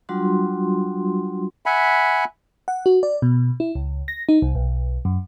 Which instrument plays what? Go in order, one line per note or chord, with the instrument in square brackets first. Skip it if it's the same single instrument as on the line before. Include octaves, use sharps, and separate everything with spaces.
[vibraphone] F#3 G3 D4 F4 F#4 C6
[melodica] E5 F#5 G#5 B5
[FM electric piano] F#5
F#4
D5
B2
E4
C#2
A#6
D#4
C2
B1
F#2